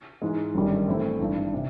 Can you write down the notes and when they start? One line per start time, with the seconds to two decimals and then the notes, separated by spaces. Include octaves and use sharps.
0.22 G#2 E3 G#3
0.54 G1 F#2 D#3 G3
0.87 A2 E3 A3 C4 E4
1.20 G#1 G2 E3
1.54 C3